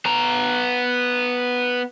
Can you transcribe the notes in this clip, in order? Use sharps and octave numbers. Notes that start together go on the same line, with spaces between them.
B3 A#5